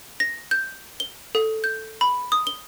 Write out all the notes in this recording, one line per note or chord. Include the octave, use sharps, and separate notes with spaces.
A#6
G6
G7
A4
G6
B5
D#6
G7